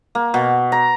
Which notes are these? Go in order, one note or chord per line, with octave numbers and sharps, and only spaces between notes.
A#3
B2
A#5